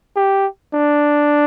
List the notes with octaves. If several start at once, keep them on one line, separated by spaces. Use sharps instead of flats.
G4
D4